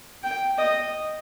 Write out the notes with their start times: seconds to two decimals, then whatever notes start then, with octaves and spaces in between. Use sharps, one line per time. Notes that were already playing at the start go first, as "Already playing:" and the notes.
0.24 G5
0.58 D#5